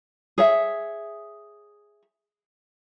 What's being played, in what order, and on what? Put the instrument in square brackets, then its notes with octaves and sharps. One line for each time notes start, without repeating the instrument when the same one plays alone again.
[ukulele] G#4 C#5 E5